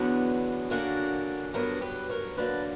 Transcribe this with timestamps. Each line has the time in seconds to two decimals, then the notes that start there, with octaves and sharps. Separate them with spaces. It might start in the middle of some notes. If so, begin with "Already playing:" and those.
Already playing: E2 D3 F#3 B3 D4
0.70 D3 A#3 C#4 D4 F#4
1.54 G2 F#3 B3 D4 F#4 A#4
1.81 G4 B4
2.10 A#4 C#5
2.37 D3 F#3 A#3 D4 B4 D5